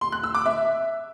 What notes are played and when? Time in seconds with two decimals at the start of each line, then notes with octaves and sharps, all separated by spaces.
0.01 C6
0.12 F#6
0.23 E6
0.35 D6
0.46 E5